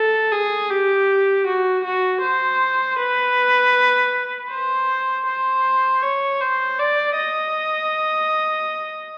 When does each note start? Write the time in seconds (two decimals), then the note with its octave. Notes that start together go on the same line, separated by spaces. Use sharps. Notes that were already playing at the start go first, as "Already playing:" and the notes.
Already playing: A4
0.32 G#4
0.70 G4
1.46 F#4
1.84 F#4
2.22 C5
2.98 B4
4.51 C5
5.27 C5
6.03 C#5
6.41 C5
6.79 D5
7.17 D#5